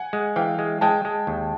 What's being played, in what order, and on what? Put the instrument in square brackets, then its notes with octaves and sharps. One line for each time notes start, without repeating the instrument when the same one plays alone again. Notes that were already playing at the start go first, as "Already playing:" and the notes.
Already playing: [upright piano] F#5 G#5
[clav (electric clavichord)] G#3
[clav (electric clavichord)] E3 [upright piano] F5 G5
[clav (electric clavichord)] G#3
[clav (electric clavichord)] G#3 [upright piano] G5 A5
[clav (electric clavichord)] G#3
D#2